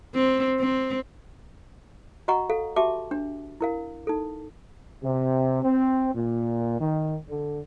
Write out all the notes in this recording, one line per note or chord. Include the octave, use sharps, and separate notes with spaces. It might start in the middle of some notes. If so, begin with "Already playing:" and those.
C4
C4
F#4 D#5 F#5 A#5 C#6
A4 F5
F#4 G4 E5 A5 D6
D4
E4 A#4 F5
D#4 A4
C3
C4
A#2
D#3
D3